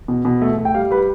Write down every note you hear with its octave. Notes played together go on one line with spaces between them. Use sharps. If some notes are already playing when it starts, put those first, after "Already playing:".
B2
B2
A3
A3
G5
G3 F5
G3 B4